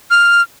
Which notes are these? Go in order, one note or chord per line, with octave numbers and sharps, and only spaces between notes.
F6